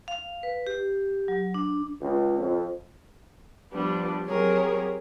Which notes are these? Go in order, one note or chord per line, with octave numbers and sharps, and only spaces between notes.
F5
B4
G4
F#3
D4
C#2
F2
F3 G3 B3 D4
F#3 C4 G4 G#4 A#4 C#5